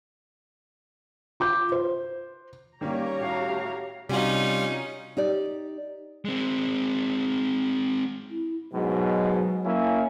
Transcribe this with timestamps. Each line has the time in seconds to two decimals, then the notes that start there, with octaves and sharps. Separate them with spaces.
1.40 F4 D6 G6
1.72 C5
2.81 D#3 G3 A#3 C#4 G4 C#5 A#5
3.20 A2 F#4 F5
4.09 C3 G3 C#4 D#4 F4 F#4
5.17 D#4 G4 D5
6.25 G#3 C4
8.30 E4
8.72 G#2 B2 F#3
9.65 A#3 C#4 E4